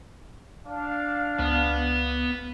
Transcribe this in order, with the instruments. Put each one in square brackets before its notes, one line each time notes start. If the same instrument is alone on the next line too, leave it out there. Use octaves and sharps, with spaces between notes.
[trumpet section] D4 F5
[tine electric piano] C#2 [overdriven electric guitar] B3